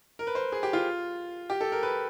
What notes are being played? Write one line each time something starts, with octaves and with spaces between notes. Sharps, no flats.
A#4
B4
C5
G#4
G4
F4
G4
A4
A#4
B4